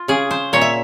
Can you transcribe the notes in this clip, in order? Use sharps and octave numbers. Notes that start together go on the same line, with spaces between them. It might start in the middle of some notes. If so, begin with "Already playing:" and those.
Already playing: F4
C#3 G#4
C5
A#2 C#5
E5